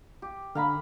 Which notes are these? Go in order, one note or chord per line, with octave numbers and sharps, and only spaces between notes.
G4
D3 F5 A#5 B5